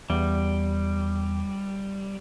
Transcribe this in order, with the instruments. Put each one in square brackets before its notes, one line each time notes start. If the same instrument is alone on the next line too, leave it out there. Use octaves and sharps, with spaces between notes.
[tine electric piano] E2 [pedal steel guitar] G3